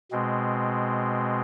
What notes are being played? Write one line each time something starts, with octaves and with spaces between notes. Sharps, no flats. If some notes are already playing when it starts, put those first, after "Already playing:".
B2 G#3 C4